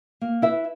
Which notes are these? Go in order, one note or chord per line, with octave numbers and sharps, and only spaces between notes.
A#3
E4 B4 E5